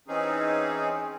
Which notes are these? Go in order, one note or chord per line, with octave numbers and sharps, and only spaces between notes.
E3 C4 C#4 D#4 G#4